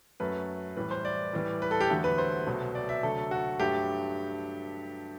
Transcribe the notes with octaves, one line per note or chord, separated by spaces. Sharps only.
F#2 F#3 A3 B4
A2 E3 G3 B4
C5
D5
A2 E3 G3
B4
A4
G4
E2 D3 F#3 A3
B4
C5
C2 B2 F#3 A3
D5
E5
D2 C3 F#3 A3 A4
F#4
G2 F#3 A3 G4